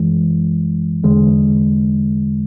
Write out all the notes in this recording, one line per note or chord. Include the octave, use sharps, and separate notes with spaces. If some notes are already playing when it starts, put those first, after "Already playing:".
Already playing: F#2 E3 G#3
E2 D3 G#3